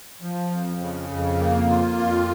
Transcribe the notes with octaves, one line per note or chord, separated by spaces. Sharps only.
F3
F2
C#3
F2
A#3
F4
F2